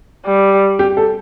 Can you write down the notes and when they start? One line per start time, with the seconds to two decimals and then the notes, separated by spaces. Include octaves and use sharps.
0.26 G3
0.79 G4
0.97 A4